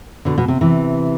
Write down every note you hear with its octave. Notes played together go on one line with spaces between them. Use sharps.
B2 D3
B2
C3
C3 E3